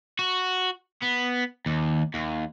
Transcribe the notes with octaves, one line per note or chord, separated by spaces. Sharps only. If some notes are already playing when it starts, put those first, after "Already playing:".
F#4
B3
D#2
D#2